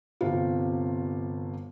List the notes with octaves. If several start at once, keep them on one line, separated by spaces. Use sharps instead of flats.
G1 C3 C4 F4